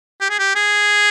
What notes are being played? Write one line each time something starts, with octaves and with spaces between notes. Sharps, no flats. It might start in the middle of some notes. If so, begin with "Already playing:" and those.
G4
G#4
G4
G#4